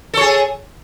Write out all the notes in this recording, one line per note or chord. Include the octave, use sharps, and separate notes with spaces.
G#4 A4 C#5